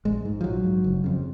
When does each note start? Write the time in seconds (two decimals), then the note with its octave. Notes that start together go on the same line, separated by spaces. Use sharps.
0.05 A#1 G#3
0.25 G#2
0.41 F3
0.44 A#1 F#3
0.64 G#2
0.84 F#1
1.04 F2 C#3